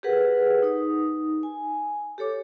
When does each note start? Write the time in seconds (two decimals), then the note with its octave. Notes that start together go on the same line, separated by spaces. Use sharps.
0.03 G4 G#4 A#4 B4 F#5
0.62 D#4 D#6
1.43 G#5
2.18 G4 A4 C#5 D6